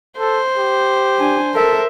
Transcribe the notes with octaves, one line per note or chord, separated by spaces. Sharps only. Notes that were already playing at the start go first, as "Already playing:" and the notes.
A4 C5
G4
D4 G#5
A4 A#4 E5